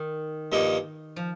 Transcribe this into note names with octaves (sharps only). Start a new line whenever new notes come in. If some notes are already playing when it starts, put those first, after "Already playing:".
Already playing: D#3
G2 F3 A#3 D#4
F3